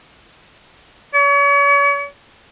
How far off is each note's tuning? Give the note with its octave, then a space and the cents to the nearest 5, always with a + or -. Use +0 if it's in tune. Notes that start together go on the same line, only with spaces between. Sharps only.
C#5 +40